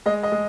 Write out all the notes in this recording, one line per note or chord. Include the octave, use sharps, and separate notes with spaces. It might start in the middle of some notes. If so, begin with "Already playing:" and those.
G#3 D#5
D#5
G#3